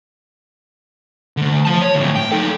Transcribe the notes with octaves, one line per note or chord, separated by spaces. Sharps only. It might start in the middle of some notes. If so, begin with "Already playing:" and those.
D3 A3
F3 A5
C#5
D2 A2
G5
D#4 A4